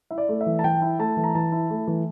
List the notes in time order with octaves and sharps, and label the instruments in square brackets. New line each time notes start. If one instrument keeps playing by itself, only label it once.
[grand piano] E4 E5
D5
A3
E5
E3
A5
E3 G5
E4
A3 A5
E3
A#5
E3 A5
E4
A3
E3